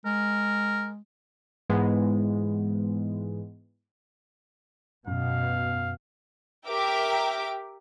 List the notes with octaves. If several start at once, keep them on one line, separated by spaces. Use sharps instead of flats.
G#3 A#4
G#2 E3 G#3 B3
F#2 B2 F5
G4 A#4 E5 G5 D6